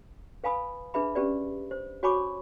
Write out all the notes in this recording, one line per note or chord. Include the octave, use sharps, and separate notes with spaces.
B4 F5 G#5 B5 D#6
D4 G#4 B4 E5 B5
C#4 G4 B4 D5
C5
F#4 C#5 G#5 B5 C#6 D6